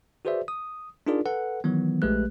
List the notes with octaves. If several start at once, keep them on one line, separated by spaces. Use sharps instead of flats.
F#4 G#4 B4 C5 D5 E5
D#6
D4 D#4 F4 G#4 A#4 D5
A4 B4 F#5
D#3 E3 F#3 B3
A#1 G#3 A3 G4 B4 F#6